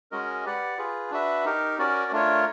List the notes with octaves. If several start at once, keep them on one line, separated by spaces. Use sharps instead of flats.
G#3 C#4 F#4 A#4 D#5
G4 B4 D5 F#5
F4 G#4 B4
D4 F#4 B4 E5
D#4 G4 A#4
C#4 F#4 A#4 D5
A3 D4 F4 A#4 C#5